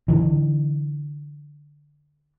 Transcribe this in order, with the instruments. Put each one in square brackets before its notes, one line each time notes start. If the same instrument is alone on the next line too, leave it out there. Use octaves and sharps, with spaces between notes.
[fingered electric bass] D3 E3